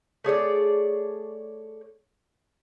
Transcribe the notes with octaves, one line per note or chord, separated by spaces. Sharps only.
A3 G#4 C#5 D5